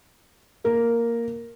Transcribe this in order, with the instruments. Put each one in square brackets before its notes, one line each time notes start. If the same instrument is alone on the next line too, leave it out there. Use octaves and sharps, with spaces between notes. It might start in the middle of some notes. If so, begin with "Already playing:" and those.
[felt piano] A#3 A#4